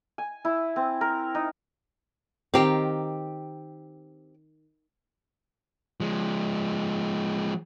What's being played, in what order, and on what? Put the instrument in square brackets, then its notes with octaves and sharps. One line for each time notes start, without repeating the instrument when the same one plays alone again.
[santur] G#5
E4
C4
A#4
D#4
[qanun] D#3 A#4 F5 [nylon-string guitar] C4 G4
[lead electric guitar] F3 G#3